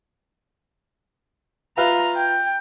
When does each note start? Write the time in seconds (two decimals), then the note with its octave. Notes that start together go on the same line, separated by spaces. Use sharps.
1.77 F4 B4 E5 A#5
2.16 G5